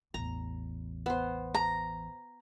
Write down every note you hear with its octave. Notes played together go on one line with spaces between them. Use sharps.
A1 E2 A#5
B3 C5
A#5